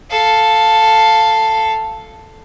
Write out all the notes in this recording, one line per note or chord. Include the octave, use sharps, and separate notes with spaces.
A4 F5